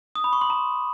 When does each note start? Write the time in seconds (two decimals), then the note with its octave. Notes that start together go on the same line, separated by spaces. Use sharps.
0.15 D#6
0.24 B5
0.33 C#6
0.41 C6
0.50 A#5